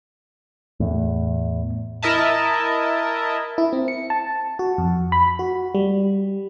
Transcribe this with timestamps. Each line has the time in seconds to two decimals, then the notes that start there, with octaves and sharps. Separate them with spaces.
0.80 E2 A2
2.02 E4 A#4 D#5 E5 A5
3.58 E4
3.73 C4
3.88 C#7
4.10 A5
4.59 F#4
4.78 F2
5.12 B5
5.39 F#4
5.75 G3